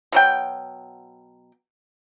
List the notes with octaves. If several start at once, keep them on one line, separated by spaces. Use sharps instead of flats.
B2 F#3 G5